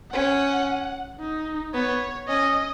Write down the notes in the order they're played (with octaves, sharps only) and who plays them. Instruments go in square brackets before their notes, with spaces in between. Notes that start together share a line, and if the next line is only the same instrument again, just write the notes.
[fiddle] C#4 [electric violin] F#5
[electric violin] D#4
[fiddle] B3 [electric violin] C#5
[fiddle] C#4 [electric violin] D#5